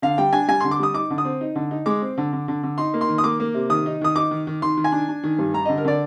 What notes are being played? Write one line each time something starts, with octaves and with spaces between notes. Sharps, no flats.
D3 F5
G3 G5
D4 G#5
G3 G#5
D3 C6
D6
G3 D#6
D#4 D6
D3
D#6
C4
D#4
D3
D#4
G#3 D6
C4
D3
D3
D3
D3
D#4 C6
A#3
C6
D#3
D#6
A#3 D6
A#3
C3
D#3 D#6
D#4
D#3 D#6
D#4 D6
D#3
D#3
D#3 C6
D#3
G#5
D4
D4
D#3
G2
G3 A#5
D3 D#5
A#4
D3 D5